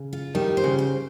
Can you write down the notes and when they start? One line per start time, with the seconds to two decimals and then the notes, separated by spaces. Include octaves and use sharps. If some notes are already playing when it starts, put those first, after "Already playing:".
Already playing: C#3
0.13 F4
0.35 D#3 G3
0.57 C5
0.64 C#3
0.79 C5